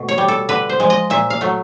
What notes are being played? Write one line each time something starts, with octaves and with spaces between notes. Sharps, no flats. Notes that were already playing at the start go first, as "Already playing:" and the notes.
Already playing: B2 A3
C#5
G3
A4
D3 B4
C5
F3 G#3
D#5
A#2 E5
F5
F#3 A3